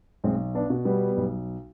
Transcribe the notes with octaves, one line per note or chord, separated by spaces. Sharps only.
B1 G#3 C4
B3 D4
B2
G3 B3
B1